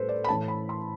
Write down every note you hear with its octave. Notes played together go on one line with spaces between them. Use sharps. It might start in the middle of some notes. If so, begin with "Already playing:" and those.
Already playing: A2 G3 A4 B4 C5
D5
B5
A2 E3 A3 A5
B5
C6